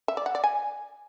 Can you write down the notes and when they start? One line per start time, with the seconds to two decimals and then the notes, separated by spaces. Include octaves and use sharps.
0.08 E5
0.17 D5
0.26 F#5
0.35 D5
0.44 G#5